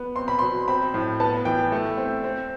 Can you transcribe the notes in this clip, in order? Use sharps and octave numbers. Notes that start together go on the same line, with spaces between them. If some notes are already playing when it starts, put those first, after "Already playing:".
Already playing: B3
C4 C6
B5
B2 C6
C4 B5
A2
B3 A5
E3 G5
A3
C4
C4